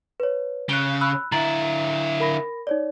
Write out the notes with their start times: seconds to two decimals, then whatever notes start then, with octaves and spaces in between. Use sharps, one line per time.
0.20 B4 C#5
0.69 C#3 F#6 D7 G7
1.01 B5 E6 F#6
1.32 D3 E4 A#5 A6 F#7
2.20 A#4 B5 A#6
2.67 D#4 C#5 D5